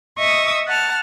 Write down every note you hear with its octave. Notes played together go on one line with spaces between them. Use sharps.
D#5 E5 C#6 D#6 E6
F#5 A5 F6